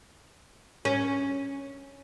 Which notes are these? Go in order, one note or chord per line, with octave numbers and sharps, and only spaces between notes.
C#4